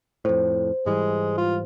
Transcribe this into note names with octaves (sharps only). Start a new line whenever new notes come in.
F2 A2 C5
G#2 E3 G3 G#3
F4